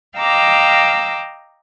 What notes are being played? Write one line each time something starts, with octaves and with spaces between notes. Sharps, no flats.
D#5 F5 G5 A#5 D6 E6